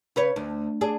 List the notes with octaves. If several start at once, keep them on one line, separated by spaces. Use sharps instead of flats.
C#3 B4 C#5
D2
D4 G#4